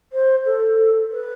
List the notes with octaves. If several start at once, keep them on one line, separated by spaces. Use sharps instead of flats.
C5
A4
B4